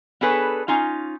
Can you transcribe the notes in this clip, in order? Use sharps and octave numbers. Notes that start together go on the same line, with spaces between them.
B3 D4 G#4 A4 B4 C#5
C#4 D#4 F4